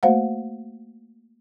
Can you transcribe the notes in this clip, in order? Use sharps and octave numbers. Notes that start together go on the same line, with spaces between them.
A3 A#3 F#4 C5 F5 F#5